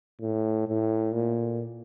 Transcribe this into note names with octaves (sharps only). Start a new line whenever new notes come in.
A2
A2
A#2